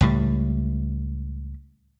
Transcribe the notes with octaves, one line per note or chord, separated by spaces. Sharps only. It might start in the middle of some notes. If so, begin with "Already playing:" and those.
C#2 A2 G3